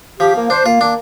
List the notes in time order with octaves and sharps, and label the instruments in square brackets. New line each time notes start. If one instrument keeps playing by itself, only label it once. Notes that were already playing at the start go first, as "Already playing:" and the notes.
[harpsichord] F3 [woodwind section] G4
[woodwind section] A#3
[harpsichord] D4 [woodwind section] C5
[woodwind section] A#3 [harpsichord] F4
[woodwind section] A#3 [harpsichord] D4